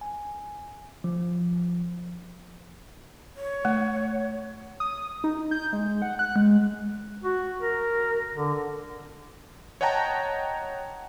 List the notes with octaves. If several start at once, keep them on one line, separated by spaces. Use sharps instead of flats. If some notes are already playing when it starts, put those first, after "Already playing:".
G#5
F3
C#5
A3
D#6
D#4
G6
G#3
F#5
F#6
G#3
F#4
A#4
D3
C#5 D#5 F#5 G5 A5 A#5